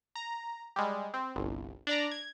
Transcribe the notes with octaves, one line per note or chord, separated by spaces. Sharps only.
A#5
G3 G#3
C4
G1 C2
D4 D5 A#5
G#6